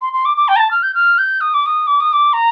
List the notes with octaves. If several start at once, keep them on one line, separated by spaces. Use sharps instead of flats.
C6
C6
D6
D6
G5
A#5
A5
F6
G6
F6
G6
D#6
D6
D#6
D6
D#6
D6
A#5